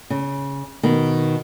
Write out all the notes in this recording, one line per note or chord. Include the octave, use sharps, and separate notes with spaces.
C#3
B2 D#3